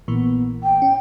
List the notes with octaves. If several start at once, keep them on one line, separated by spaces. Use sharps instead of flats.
A#1 A#2 E3 B3
G5
C#4